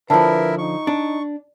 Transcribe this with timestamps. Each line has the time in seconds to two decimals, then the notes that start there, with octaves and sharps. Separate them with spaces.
0.10 D3 F3 E4 A#4 B4 E5 A5
0.58 D#4 C#6
0.87 D4